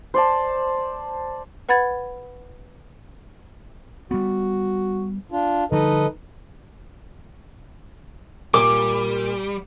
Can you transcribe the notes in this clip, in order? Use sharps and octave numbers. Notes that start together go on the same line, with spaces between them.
C5 D5 A5
B4 F#5 B5 G#6 A6
G3 B3 F#4
D4 F4
D3 F3 G3 D#4 A4 B4 D#5
A#2 G3 A#3 D6